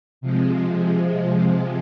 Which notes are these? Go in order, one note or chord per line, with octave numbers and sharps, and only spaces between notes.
C3 F3 G#3